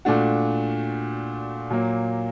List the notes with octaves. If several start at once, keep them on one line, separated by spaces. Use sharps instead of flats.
A#2 A3 D4 F#4
A#2 F#3 A#3